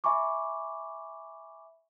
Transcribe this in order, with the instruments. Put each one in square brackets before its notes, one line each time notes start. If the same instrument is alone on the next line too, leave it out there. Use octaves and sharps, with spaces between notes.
[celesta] E5 G#5 B5 C#6 D6